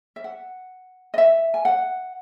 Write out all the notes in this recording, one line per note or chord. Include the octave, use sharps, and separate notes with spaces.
E5
F#5
D#5
E5
G#5
F#5